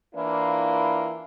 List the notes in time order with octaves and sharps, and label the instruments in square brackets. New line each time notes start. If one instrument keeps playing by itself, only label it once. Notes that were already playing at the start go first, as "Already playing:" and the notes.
[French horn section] E3 A#3 D4 E4 F4